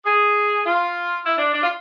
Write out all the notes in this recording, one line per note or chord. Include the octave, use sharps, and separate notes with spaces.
G#4
F4
E4
D4
D4
F4